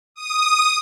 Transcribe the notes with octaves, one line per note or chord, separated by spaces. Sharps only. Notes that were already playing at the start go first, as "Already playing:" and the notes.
D#6